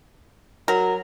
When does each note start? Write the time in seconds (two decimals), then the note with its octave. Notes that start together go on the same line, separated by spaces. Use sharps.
0.68 F#3 A#4